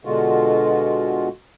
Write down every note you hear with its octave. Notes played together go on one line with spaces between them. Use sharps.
B2 D3 G#3 F4 F#4